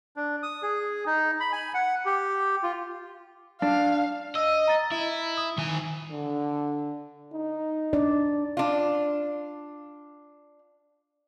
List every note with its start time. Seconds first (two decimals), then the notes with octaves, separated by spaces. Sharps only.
0.16 D4
0.43 D#6
0.63 G#4
1.06 D#4
1.40 B5
1.52 G#5
1.74 F#5
2.05 G4
2.63 F4
3.62 D4 F5
4.35 D#5 E6
4.68 A#5 A6
4.92 E4
5.37 D#6
5.58 D#3 G#5
6.11 D3
7.33 D#4
7.93 D4 D5
8.57 D4 F4